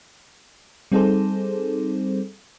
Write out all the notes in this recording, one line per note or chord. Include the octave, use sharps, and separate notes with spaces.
G3 C4 D#4 G#4 A4 C5